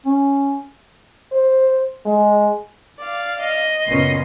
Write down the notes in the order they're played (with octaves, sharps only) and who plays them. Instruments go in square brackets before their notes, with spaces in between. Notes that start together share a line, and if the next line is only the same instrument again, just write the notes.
[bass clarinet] C#4
[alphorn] C5
G#3
[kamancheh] D5 F5
[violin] D#5
[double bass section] F#1 C#3 B3 [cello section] A#2 C#4 [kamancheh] C6